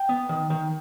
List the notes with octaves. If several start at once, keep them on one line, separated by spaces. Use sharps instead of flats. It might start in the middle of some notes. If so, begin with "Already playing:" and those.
Already playing: G5
B3
D#3
D#3